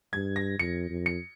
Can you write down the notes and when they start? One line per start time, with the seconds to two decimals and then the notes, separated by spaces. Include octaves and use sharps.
0.13 G2 G#6
0.36 A#6
0.59 F2 C#7
0.90 F2
1.06 C#7